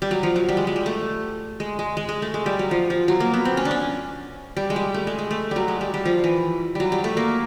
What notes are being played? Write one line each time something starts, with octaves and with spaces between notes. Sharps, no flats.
G3
F#3
F3
F#3
G3
G#3
G#3
G3
A3
G#3
G#3
G#3
G#3
A3
G#3
G3
F#3
F3
F3
F#3
A#3
B3
C4
C#4
D4
C#4
G3
G#3
G3
A3
G#3
G#3
A3
F#3 G3
G#3
G3
G3
F3
E3
F#3 G3
G3
A3
A#3